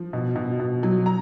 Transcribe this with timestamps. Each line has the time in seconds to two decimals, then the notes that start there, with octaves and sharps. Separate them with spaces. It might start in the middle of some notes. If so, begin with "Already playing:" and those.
Already playing: F3
0.13 B2
0.36 B2
0.60 B2
0.83 F#3
1.06 A#5